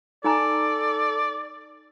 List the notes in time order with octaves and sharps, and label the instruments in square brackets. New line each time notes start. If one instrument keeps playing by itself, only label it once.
[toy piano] D#4 G#5 A#5 [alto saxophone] A4 [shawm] D5